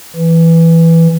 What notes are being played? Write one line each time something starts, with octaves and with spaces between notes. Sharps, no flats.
E3